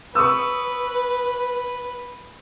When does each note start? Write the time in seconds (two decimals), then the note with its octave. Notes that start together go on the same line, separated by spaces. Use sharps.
0.15 B4 C#6 D#6 E6